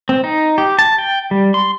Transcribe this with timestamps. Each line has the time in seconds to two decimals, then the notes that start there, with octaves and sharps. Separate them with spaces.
0.09 C4
0.24 D#4
0.58 G4
0.79 A5
0.98 G5
1.31 G3
1.54 C6